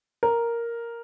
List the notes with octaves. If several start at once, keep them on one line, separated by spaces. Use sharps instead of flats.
A#4